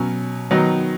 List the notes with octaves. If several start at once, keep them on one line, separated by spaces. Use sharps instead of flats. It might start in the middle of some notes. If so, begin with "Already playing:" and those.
Already playing: B2 F#3 C#4
D#3 F#3 B3 D#4